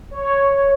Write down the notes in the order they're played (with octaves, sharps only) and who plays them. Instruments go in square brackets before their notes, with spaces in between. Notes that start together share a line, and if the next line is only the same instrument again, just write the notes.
[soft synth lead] C#5